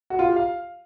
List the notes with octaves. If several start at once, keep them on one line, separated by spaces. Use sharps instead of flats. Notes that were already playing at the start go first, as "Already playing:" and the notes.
F#4
F4
G4
F5